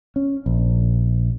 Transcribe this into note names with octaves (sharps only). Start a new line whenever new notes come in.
C#4
A#1